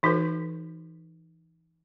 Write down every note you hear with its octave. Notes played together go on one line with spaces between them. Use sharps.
E3 D#4 F#4 A4 B4